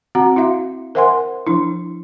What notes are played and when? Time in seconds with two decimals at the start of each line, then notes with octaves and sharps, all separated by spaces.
0.15 C4 F#4 F#5 A#5
0.36 E4 F#4 E5 F5
0.95 A#4 C5 E5 F#5 G#5 C6
1.47 F3 D4 E4